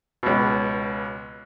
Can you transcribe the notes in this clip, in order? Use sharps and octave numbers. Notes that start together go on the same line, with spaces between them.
C#2 B2